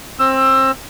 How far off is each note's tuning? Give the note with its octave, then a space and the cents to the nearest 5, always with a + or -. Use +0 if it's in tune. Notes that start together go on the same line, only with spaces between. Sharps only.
C4 +25 E6 +15